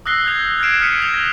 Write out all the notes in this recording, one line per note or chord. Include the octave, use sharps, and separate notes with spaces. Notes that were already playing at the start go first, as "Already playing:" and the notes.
D#6 E6 F#6 A#6 C7 G7
G6 G#6 F7 G7
F6 G#6 A#6 C7 D7 E7
D#6 F6 B6 C#7 D#7 F7
G#6 F7 G7
A#6